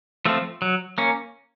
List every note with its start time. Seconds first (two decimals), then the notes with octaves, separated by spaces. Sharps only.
0.26 F3 A3 C4
0.62 F#3
0.98 A#3 C#4